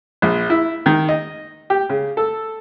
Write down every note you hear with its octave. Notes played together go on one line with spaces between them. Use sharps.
A#1
E4
D#3
D#5
G4
C#3
A4